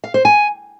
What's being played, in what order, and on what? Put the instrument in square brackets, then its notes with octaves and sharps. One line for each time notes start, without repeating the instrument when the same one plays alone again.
[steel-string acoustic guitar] F5
C5
G#5